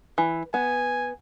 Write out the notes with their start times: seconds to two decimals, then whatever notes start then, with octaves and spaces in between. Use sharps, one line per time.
0.18 E3
0.54 B3 G#5